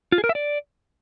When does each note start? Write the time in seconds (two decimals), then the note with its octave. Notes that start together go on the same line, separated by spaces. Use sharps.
0.12 F4
0.18 G#4
0.24 A#4
0.29 E5
0.35 D5